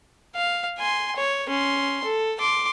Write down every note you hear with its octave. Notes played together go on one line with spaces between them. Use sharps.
F5
G#5 C6
C#5
C#4 C6
A4
C6 D6